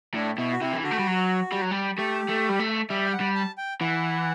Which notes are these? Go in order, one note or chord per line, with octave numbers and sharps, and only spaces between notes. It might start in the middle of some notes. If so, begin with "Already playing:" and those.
A2 D4
B2 E4
F#4
C3 E4
E3
D3 F#4
A3
G3
F#3
G3
F#3
G3
A3 G4
A3
G3
A3
G3 E5
G5
F#5
G3
A5
G5
E3 F#5